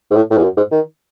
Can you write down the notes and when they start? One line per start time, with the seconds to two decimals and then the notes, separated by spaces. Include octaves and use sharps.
0.10 G#2
0.16 A2
0.30 A2
0.37 E2
0.43 F#2
0.57 G#2
0.71 D#3